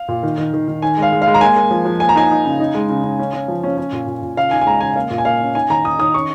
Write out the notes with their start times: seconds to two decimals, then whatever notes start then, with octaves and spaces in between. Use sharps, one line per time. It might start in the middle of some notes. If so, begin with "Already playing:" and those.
Already playing: F5
0.08 A#2
0.23 D#3
0.38 D#3
0.54 D#3
0.68 D#3
0.82 D#3 G#5
0.97 G#3 F5
1.13 G#3
1.22 F5
1.27 G#3
1.34 A#5
1.41 A#3 G#5
1.56 A#3
1.71 F3
1.85 F3
2.00 A#3 G#5
2.09 A#5
2.15 D#4 G#5
2.31 D#4
2.45 C#3
2.60 D#4
2.75 G#3
2.89 C#3
3.04 C#3
3.19 C#4
3.33 C#4
3.48 F3
3.63 C#4
3.78 C#4
3.92 A#2
4.07 A#2
4.22 A#2
4.37 C#3 F5
4.51 D#4 G#5
4.61 G#5
4.66 G#3 A#5
4.81 C#3 G#5
4.96 A#3 F5
5.11 A#2
5.18 G#5
5.25 A#3 F5
5.41 C#4
5.55 D#4 G#5
5.70 D#3 A#5
5.85 D#4 D#6
5.99 D#3 D#6
6.14 C#4 C#6